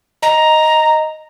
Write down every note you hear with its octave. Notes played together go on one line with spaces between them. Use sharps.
D#5 A#5